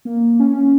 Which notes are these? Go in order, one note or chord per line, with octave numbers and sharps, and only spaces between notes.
A#3
C#4